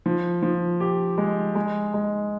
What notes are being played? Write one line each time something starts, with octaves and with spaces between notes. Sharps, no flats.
F3
F3
G4
G#3
G#3
G#3